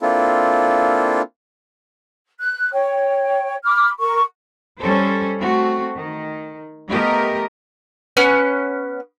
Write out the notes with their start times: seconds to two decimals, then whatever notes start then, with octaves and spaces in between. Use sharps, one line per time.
0.02 A#3 C4 D4 E4 F4 A4
2.40 F#6
2.72 C#5 G5
3.64 B5 D6 F6
4.00 A#4 C#6
4.80 G3 C#4 A4 C5
5.40 A3 C4 F#4
5.96 D#3
6.90 A3 B3 G4 A#4 D#5
8.17 B3 C#4 F#6